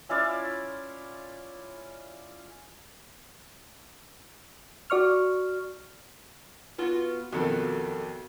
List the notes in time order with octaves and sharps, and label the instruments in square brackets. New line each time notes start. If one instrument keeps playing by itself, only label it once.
[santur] C#4 E4 F4 D5
[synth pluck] F#4 D5 C#6 F6
[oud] B3 F4 F#4
[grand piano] B1 F2 D#3 [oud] F#4 A4